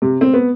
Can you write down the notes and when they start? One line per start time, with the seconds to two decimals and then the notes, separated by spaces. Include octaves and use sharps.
0.02 C3
0.21 C4
0.33 B3